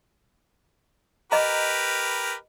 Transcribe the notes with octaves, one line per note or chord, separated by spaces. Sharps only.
G4 A#4 B4 D#5 A#5